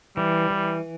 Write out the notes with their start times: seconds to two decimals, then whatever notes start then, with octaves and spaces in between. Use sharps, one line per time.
0.17 E3 G3
0.50 E3